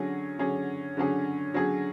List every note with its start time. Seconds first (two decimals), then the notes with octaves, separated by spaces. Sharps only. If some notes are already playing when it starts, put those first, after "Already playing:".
Already playing: D3 F#3 C#4 G#4
0.39 D3 F#3 C#4 G#4
0.97 D3 F#3 C#4 G#4
1.54 D3 F#3 C#4 G#4